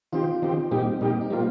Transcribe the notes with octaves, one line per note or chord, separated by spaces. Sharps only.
D#3 C4 F4 G4
D#3 C4 G4
A#2 G3 C4 D#4 G4
A#2 G3 D#4 G4
D#4
G3 A#3 C4 F4